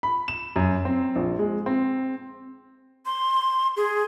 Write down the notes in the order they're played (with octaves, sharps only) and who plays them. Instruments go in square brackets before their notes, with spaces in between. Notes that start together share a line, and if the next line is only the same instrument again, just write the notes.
[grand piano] B5
E7
F#2
C4
A#1
G#3
C4
[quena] C6
G#4